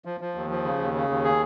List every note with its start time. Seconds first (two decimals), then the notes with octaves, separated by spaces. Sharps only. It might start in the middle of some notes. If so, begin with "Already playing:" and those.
0.05 F3
0.21 F3
0.35 D#2
0.50 F3
0.64 C#3
0.79 D#2
0.94 C#3
1.09 D#2
1.24 G#4